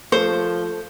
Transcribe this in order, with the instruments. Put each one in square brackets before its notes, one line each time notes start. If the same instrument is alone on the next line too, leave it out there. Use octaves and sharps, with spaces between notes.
[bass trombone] F3 [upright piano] A3 C#7 [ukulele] C5